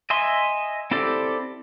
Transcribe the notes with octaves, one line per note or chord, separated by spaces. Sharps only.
D#5 E5 G#5 C6
C4 E4 G4 A4 D5